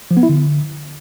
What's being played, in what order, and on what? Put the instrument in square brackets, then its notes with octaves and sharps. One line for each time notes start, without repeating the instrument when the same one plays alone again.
[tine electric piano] F3
B3
E4
D3